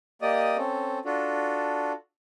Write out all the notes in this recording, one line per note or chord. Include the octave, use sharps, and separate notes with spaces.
A#3 G4 D5 D#5 D#6
C4 C#4 A4
D4 F4 F#4 A4